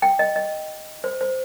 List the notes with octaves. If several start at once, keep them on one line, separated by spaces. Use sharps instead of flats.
G5
D#5
D#5
C5
C5